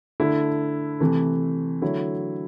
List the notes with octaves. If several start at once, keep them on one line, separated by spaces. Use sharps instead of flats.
D3 A3 E4
C3 E3 A3
D3 F#3 A3 E4